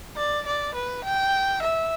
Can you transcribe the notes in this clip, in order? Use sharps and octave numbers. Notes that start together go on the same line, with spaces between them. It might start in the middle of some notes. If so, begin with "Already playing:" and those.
D5
D5
B4
G5
E5